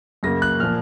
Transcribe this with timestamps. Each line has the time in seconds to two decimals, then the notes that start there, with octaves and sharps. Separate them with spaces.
0.23 F#2 C#3 F#3 A#3 A#6
0.42 F#6
0.60 A#2 F3 A#3 F6